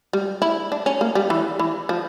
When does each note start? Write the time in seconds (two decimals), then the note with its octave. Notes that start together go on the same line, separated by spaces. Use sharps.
0.13 G3
0.42 E4
0.72 D4
0.86 C#4
1.01 A#3
1.15 G3
1.30 E3
1.59 E3
1.89 F3